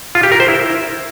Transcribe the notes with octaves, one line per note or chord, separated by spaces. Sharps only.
F4
G4
A#4
C5
E4